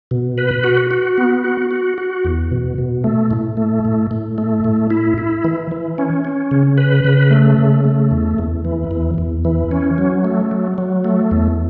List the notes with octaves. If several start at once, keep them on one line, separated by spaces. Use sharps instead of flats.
B2
B4
F#4
F#4
B3
F#4
F#4
F#4
E2
B2
B2
A3
A2
A3
A2
A2
A3
A2
E4
E4
E3
E3
C#4
C#4
C#3
B4
C#3
A3
C#3
A3
E2
E2
E3
E2
E2
E3
C#4
F#3
A3
F#3
F#3
A3
E2